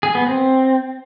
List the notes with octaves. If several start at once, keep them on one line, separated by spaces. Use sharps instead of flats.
G#4
B3
C4